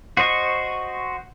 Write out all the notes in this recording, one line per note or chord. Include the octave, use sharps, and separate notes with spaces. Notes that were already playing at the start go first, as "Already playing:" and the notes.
F#4 C5 D#5 C#6